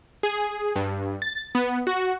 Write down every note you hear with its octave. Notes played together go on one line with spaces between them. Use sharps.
G#4
G2
A6
B3
F#4